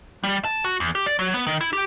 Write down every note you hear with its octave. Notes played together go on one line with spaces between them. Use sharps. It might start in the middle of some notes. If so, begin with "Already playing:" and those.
G3
A5
F#4
E2
G4
D5
F#3
B3
D#3
E4
G4